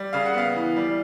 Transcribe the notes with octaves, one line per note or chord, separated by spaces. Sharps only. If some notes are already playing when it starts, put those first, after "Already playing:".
Already playing: G3
C#3 F5
F#5
B3 F5
E3
G3